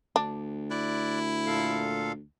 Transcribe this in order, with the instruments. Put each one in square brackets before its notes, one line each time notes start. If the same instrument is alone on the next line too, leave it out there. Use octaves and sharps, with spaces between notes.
[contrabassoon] D2 [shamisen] D4
[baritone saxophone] E4 [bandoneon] D5 F#6
[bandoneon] A#2 A4 F5